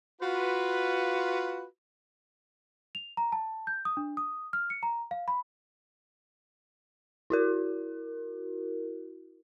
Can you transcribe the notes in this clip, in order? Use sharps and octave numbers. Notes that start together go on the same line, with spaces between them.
F4 F#4 B4
F7
A#5
A5
G6
D#6
D4
D#6
F6
C#7
A#5
F5
B5
E4 F#4 A#4